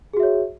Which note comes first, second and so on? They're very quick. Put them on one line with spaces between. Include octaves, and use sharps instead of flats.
G#4 F#4 E5 C#5